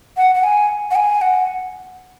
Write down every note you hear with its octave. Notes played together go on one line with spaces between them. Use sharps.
F#5
F#5
G#5
F#5
G#5
F#5